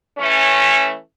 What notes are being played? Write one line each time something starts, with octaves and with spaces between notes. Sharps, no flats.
E3 A3 C#4